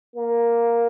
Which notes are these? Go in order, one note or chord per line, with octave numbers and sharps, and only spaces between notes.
A#3